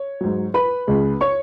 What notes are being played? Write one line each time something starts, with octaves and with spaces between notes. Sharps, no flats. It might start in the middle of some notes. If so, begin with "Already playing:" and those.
Already playing: C#5
G#2 F#3
B4 B5
C#2 C#3 G#3
C#5 C#6